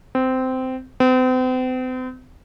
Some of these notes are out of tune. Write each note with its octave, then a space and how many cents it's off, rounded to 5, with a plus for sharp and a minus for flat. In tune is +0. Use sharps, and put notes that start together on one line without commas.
C4 -15
C4 -40